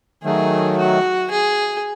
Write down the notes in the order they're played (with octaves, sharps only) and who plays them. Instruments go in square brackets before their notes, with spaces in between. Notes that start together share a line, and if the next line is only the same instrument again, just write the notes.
[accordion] D#3 F#3 A3 [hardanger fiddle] G#4
[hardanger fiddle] F#4
G#4